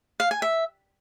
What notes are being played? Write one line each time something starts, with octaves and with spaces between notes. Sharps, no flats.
F5
G#5
E5